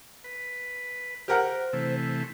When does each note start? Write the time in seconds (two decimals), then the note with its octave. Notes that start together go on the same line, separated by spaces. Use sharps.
0.24 B4
1.28 G4 A#4 C5 F#5
1.73 C3 E3 A3